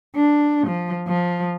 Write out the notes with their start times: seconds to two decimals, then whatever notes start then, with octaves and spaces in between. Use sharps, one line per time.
0.15 D4
0.68 F3
1.07 F3